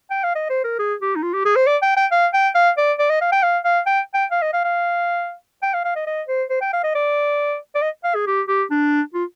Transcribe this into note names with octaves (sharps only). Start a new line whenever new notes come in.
G5
F5
D#5
C5
A#4
G#4
G4
D#4
F4
G4
G#4
C5
D5
G5
G5
F5
G5
F5
D5
D5
D#5
F5
G5
F5
F5
G5
G5
F5
D#5
F5
F5
G5
F5
F5
D#5
D#5
C5
C5
G5
F5
D#5
D5
D5
D#5
F5
G#4
G4
G4
D4
F4